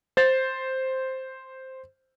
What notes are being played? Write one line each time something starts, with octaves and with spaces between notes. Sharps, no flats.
C5 A6